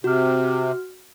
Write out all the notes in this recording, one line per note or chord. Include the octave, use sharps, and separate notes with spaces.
C3 F#4 F6